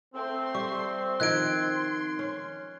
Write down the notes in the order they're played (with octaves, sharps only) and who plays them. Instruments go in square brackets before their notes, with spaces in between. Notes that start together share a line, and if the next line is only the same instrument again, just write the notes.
[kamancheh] A3 C6 [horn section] C4
[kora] G3 [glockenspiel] C#6
[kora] D#3 F3 [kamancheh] C6 [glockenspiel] F#6 G#6 D7
[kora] C#4